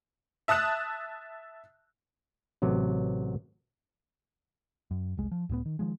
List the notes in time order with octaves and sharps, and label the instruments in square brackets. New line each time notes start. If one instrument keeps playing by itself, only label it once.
[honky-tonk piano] E5 A5 D#6 F#6 E7
[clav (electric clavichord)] A1 C3 F#3
[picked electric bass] F#2
F1 C2 G#3
F3
C#2 A2 G#3 B3
D#3
D#3 F3 G#3